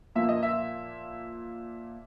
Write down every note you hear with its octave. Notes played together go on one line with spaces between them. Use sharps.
A#2 F3 A#3 E5
D#5
E5